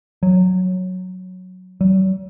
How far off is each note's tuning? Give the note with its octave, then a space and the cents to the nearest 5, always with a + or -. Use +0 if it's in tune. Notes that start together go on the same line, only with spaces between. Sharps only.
F#3 -5
F#3 +45